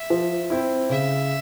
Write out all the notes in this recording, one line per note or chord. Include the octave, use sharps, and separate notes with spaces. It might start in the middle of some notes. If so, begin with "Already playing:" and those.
Already playing: E5
F3
C4 E4
C#3 E5